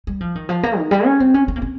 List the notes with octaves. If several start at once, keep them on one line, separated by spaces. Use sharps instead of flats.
G3
F3
D#3
F3
A#3
D#3
G3
C#4
C4
C#4
C#4
A#3
C4